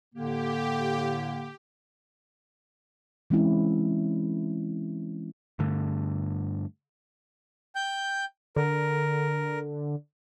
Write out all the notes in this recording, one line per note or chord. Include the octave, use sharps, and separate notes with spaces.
A2 D3 A#3 G4
E3 G#3 C4 C#4 E4
G2 D3 A3
G5 G6
D3 A#4